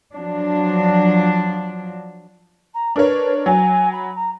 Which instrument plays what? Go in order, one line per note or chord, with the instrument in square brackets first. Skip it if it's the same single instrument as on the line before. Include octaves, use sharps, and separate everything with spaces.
[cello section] F3 F#3 D4
[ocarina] A#5
[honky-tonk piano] D4 A#4 C#5 [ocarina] B4
[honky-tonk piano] F#3 [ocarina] G#5
[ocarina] B5
A#5